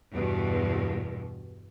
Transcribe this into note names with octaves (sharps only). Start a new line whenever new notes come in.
E2 G2 B2